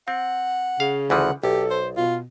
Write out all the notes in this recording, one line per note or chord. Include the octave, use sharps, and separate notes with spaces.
C4 F#5
C#3 F5
D2 E3 F3 F#5
B1 G4 A4
C5
B2 F4